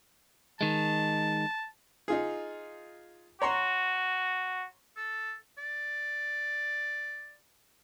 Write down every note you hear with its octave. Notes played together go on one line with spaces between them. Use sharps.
D#3 G#3 A5
D#4 F4 G#4
F#4 C#5 A#5 C6
A4
D5